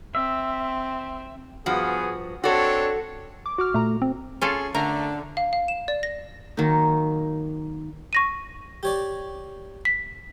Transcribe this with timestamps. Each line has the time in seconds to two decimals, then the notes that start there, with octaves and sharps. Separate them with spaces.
0.15 C4 E5
1.66 G2 F3 B3 F#4 G#4
2.44 C4 D4 F#4 A4 C#5
3.46 D6
3.58 F#4 D6 F6
3.74 A#2 A3 A#5
4.02 C4
4.41 C#4 F4 G#4 A4
4.75 D3 A3 A#4 A#5
5.37 F5
5.53 F5
5.68 E7
5.88 D5
6.03 A#6
6.57 D#3 F#3 A#3 D#4
8.13 C#6 A#6 D#7
8.83 G4 C#5 D5
9.85 B6